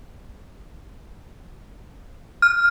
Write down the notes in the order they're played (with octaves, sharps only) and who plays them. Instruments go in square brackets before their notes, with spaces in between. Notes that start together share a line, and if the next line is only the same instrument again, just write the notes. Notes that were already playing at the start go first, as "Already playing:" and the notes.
[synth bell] F6